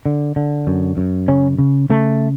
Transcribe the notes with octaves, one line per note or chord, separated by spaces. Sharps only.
D3
D3
F#2
F#2
C#3 C#4
C#3
C#3 A3